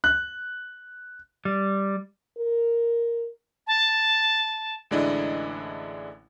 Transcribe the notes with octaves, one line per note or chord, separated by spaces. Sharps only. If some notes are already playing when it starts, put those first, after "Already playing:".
F#6
G3
A#4
A5
A1 D3 G#3 D4 E4 D#5